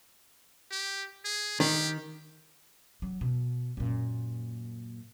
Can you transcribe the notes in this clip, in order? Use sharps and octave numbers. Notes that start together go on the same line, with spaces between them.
G4
G#4
D#3 G4
F#3
B2
F#2 A#2